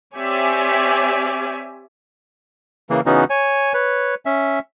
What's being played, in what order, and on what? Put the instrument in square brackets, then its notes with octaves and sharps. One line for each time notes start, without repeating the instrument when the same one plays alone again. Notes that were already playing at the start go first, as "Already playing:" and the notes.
[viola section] C4 G4 C#5 D5 E5 G#5
[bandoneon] C#3 E3 A#3
C#3 E3 B3 C#4 D#4 F#4
C#5 G#5
B4 C#5
C#4 E5